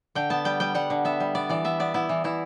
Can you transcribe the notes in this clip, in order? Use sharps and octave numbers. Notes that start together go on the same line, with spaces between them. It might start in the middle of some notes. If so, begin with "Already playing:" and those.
D3 G5
B3 A5
G3 G5
G3 G5
G3 F#5
D3
B3 E5
G3
B3 D5
E3 D5
B3 E5
B3 D5
B3 E4
E3
E3 E4